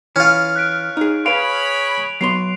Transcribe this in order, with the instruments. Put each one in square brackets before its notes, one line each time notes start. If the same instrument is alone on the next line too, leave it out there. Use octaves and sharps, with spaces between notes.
[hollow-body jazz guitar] E3 [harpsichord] C#4 F4
[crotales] F#6 B6 D7
[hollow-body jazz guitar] D#4 G#4
[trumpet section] G#4 C#5 B5 [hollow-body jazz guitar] B4 F5 [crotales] D7 F7
[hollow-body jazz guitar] F#3 B3 C6 [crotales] C7 F7